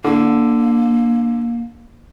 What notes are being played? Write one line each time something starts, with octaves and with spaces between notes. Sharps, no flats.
D3 A#3